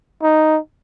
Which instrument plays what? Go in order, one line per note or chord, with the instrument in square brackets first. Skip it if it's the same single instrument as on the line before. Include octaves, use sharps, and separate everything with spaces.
[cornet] D#4